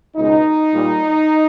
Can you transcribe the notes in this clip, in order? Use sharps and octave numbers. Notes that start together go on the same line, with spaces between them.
C#2 B2 G#3 D#4
A#2 G3